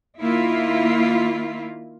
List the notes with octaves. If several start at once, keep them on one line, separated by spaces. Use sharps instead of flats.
D#3 A#3 E4 F4